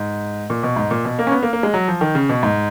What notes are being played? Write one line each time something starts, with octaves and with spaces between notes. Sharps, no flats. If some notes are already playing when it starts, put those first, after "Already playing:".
Already playing: G#2
A#2
B2
G#2
A#2
B2
A#3
C#4
B3
A#3
A#3
G#3
F#3
F3
D#3
C#3
B2
G#2